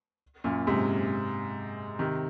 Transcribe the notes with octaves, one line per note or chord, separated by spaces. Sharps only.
F#2 A#2
G#2 C3
C3 D#3